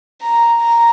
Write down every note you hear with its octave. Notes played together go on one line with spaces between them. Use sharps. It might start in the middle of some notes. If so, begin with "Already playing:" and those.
A#5
A#5